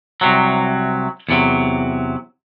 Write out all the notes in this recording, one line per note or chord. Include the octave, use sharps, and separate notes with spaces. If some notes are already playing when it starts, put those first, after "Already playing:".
C2 C3 F#3
E2 C3 D#3 F#3